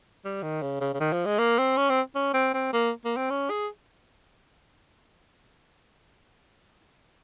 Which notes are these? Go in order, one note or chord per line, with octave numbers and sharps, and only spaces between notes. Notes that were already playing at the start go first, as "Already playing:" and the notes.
G3
D#3
C#3
C#3
C#3
D#3
F3
G#3
A#3
C4
C#4
C4
C#4
C4
C4
A#3
A#3
C4
C#4
G#4